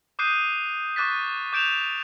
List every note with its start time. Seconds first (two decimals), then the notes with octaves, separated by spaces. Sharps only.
0.19 D6 D#6 F#6 G6 C7 D#7
0.96 C#6 D6 F#6 A6 B6
1.53 D6 G6 D7 E7 F7